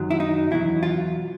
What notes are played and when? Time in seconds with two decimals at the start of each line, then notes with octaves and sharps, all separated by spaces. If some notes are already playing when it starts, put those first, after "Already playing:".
Already playing: F#2 D#3 F#3
0.11 E4
0.20 D#4
0.51 E2 B2 F#3 E4
0.83 F4